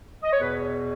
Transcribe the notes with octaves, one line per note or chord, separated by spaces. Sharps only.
D#5
C#5
E2 B2 B4